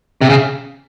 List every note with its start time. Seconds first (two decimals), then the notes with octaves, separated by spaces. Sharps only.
0.21 C3
0.29 C#3